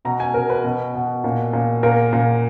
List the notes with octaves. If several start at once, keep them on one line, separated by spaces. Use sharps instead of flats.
B2 A#5
G#5
B2 A#4
B4
B2
B2
A#2
A#2
A#2 A#4
A#2